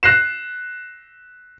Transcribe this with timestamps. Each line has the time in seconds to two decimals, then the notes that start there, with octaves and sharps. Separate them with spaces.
0.03 F#6 A#6 C7 E7